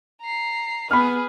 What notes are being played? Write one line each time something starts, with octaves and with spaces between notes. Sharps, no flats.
A#5 C7
B3 G#4 B4 B5 F6